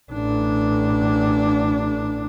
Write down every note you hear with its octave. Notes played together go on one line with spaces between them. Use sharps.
A1 D4